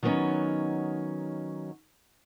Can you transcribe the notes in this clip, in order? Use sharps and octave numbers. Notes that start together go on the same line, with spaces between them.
D#3 F#3 G3 B3 C#4 D#4